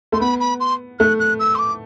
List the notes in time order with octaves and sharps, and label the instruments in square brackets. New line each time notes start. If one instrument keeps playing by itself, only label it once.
[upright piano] A3 [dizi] C6
[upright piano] B3 [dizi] B5
[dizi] B5
C6
[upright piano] A3 [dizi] F#6
[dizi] F#6
E6
C6
D6